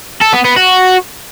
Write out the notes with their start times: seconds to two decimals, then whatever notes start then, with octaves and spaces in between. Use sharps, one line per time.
0.21 A4
0.33 B3
0.45 B3
0.57 F#4